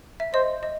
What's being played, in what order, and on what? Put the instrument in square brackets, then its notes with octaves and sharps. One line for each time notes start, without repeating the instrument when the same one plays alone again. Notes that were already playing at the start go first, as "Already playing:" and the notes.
[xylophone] E5
[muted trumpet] C5 [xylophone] D#5
[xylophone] D#5